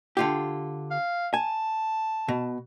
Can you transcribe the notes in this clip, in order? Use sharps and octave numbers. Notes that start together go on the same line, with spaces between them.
D3 F4 G4
F5
G#5 A5
B2